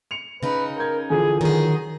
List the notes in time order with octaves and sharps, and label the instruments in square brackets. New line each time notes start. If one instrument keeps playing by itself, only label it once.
[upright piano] C#7 F7
[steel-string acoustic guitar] C#3 D#4 [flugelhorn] B4
[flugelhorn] A#4 [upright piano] G6 G#6
[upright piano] D3 E3 F3 [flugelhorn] G#4
[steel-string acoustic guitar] D#3 G#4 [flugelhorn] F#3